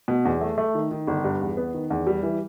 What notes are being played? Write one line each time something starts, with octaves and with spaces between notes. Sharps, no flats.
B2
E2
A3
A3
D#3
D#3
G1
G2
E2
B3
D#3
E2
G3
E3